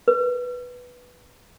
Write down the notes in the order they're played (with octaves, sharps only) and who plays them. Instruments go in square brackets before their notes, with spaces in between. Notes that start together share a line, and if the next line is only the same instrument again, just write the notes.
[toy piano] B4